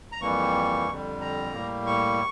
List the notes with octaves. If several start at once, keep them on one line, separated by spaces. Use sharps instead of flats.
A#5
F2 E3 G3 A#3 C#6
F2 D3 G3
A#5
A2 G3 A#3
C#6